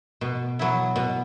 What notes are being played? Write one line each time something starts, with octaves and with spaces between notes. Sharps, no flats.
B2
F#3 B3 E4
B2